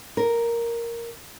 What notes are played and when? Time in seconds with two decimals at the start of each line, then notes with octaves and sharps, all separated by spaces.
0.17 A#4